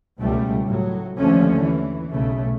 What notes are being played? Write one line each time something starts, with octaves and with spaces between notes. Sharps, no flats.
C#2 B2 G3 A3
A2 F#3
D#2 D3 F3 A3 C#4
E3
B1 C#3 A3